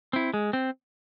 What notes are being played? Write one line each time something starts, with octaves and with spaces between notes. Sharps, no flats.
C4 E4
G#3
C4